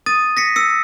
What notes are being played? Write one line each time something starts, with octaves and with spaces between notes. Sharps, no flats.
D#6 A6 D#7
A#6 B6 C#7
E6 C#7